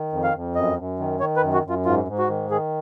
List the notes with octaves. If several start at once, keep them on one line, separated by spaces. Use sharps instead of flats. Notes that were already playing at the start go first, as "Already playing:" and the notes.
Already playing: D#3
F2
F5
F2
F#2 D#5
F#2
D#3
D#3 C#5
B4
F#2
F#4
F#2 F4
G#2 F4
G#2
F#4
D#3
D#3 G#4